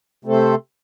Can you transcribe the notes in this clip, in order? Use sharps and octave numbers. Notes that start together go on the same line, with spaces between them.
C3 A3 C4 A4 C5